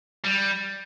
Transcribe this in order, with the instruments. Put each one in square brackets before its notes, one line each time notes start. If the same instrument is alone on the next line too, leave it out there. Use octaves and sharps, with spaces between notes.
[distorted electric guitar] G3